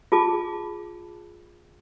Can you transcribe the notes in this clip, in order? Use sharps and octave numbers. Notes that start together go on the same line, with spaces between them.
F4 G#4 A5 D6